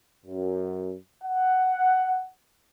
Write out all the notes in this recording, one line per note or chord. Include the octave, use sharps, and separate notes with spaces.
F#2
F#5